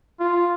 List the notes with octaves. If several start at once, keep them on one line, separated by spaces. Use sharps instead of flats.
F4